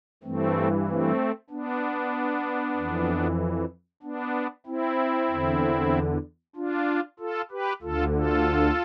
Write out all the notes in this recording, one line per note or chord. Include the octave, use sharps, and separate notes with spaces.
G2 E3 A3 C4
A3 C4
B3 D4
F2 E3
B3 D4
C4 E4
E2 D3
D4 F4
F4 A4
G4 B4
D2 D3 F4 A4
F4 A4